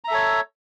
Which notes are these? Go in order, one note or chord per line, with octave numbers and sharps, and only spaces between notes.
A4 C#5 E5 A#5